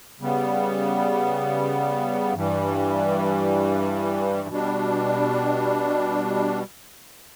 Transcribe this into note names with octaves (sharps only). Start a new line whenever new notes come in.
C#3 G3 B3
G2 E3 G3
B2 G3 D4